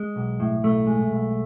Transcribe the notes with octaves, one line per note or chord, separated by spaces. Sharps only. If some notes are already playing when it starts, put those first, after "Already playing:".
Already playing: G#3
B1
A2
B1 A3
G#3
B1